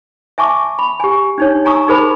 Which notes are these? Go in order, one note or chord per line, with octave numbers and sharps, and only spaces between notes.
E5 G#5 A5 C#6 D6
B5
G4 G#5
D4 D#4 C#5
D#4 G#5 A#5 C#6 D#6 E6
D#4 G#4 A#4 C5 B5